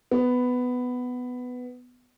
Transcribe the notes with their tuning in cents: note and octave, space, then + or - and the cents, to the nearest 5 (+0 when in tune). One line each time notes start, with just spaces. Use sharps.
B3 +10